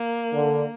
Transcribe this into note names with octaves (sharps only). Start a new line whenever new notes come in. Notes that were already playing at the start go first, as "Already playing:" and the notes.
Already playing: A#3
D3